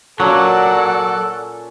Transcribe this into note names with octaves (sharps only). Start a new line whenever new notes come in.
A#2 F#3 C#4 A4 D5 F#5